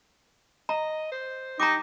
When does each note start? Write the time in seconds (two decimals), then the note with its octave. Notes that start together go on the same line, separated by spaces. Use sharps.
0.69 D#5 A#5
1.12 C5
1.60 D#4 G4 A#5 D6